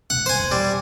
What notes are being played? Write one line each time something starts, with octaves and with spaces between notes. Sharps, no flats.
E1 B2 F#5
G2 C5 G#5
E2 E3
B2 G3